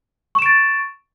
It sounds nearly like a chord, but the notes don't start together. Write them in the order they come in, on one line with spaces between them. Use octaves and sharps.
C#6 E7 D7 A6